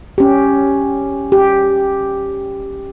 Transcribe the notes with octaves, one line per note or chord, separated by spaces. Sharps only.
C#4 G4
G4